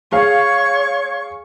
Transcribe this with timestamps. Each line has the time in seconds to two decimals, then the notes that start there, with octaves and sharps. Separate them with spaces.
0.12 G#4 C#5 F5 C#6